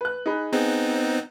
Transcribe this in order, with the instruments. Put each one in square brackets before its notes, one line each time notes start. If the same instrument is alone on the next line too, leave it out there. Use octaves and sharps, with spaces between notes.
[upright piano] B4 F#6
D#4 G#4 B5
[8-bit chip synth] B3 C4 D#4 [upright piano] G#4